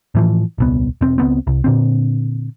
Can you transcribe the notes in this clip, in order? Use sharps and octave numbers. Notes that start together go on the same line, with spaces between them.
A2 E3 F3
D#1 C2 B3
E1 C4
C#2 B3 C4
C2
A#2 D3 C4